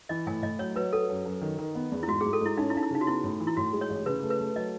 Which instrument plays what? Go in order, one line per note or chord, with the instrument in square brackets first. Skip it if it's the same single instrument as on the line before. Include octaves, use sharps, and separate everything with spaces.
[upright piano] E3 [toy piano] D#5
[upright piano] A2 [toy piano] G#5
[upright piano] A2 [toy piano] D#5
[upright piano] F#3 [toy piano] C#5
[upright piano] F#3 [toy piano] B4
[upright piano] F#3 [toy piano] A4
[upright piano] F#2
F#2
D#3
D#3
B3
E2
[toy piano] E4
[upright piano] G#2 [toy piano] F#4
[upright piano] G#2 [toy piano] G#4
[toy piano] A4
[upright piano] G#2 [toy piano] E4
[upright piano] C#4 [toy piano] D#4
[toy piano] E4
[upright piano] C#4 [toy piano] D#4
[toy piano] E4
[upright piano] C#3 [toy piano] D#4
[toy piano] F#4
[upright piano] B3 [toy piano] E4
[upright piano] A2
E3
[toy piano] E4
[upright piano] A2 [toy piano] F#4
[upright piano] G#3
[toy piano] C#5
[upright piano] A1
[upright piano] C#3 [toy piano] B4
[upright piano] A3
[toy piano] B4
[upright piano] A3
[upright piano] F#3 [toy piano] D#5